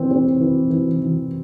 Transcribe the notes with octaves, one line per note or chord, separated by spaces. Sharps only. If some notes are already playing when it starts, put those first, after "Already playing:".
Already playing: E3 C4
C4
E3
E3
E3